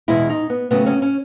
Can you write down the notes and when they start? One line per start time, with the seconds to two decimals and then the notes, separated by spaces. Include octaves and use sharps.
0.08 E2 B2 G#3 E4
0.29 D#4
0.50 B3
0.71 D#2 C#3 F#3 A3 B3
0.86 C#4
1.02 C#4